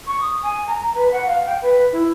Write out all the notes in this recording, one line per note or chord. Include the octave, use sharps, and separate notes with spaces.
C#6
D#6
G#5
A#5
B4
F#5
F5
G5
B4
E4